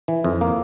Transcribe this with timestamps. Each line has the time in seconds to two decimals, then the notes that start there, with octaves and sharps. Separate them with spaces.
0.08 E3
0.24 F2
0.41 A#3